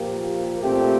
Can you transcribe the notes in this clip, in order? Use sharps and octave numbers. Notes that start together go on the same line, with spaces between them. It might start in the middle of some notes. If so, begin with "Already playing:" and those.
Already playing: A#2 F3 A#3 G4
A#2 A3 C4 G4